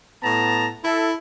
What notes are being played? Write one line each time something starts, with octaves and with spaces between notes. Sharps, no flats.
A2 B3 A5 A#5
E4 A4